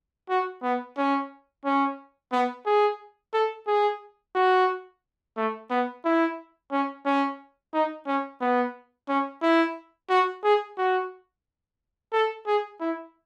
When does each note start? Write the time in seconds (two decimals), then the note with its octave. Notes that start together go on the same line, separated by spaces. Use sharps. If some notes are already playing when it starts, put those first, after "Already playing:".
0.29 F#4
0.63 B3
0.97 C#4
1.65 C#4
2.32 B3
2.66 G#4
3.34 A4
3.67 G#4
4.35 F#4
5.37 A3
5.70 B3
6.05 E4
6.72 C#4
7.05 C#4
7.74 D#4
8.07 C#4
8.41 B3
9.09 C#4
9.42 E4
10.10 F#4
10.44 G#4
10.78 F#4
12.13 A4
12.47 G#4
12.81 E4